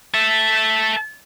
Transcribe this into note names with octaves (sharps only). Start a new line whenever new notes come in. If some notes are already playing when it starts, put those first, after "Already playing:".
A4 E5